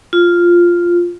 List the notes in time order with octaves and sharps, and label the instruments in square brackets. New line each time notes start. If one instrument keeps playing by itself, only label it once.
[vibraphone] F4